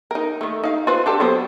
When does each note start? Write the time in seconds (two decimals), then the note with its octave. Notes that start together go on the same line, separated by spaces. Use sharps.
0.11 D#4 A#4
0.41 D#3 A3
0.64 D#4 F5
0.87 F4 B4 C5
1.06 D4 G4 A4
1.20 F#3 B3 C5